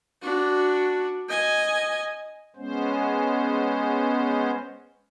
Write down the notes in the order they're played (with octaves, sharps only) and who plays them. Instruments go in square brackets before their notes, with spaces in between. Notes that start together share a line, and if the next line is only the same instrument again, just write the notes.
[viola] D4 F#4
D#5 G#5
[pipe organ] G#3 B3 C#4 C5